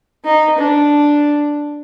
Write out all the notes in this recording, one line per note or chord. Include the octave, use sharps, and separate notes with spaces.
D#4
D4